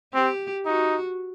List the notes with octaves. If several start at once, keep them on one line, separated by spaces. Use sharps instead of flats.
C4 G4
D#4 F#4